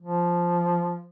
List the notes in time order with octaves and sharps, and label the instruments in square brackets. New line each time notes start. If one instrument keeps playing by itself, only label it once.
[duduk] F3